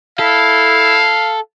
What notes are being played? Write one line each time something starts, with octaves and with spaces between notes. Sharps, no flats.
E4 A4 F5